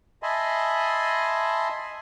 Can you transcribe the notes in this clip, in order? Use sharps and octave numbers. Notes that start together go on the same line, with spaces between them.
D#5 E5 G#5 A5 B5 C6